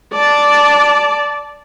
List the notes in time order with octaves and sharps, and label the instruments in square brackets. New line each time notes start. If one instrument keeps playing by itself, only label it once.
[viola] D5 A5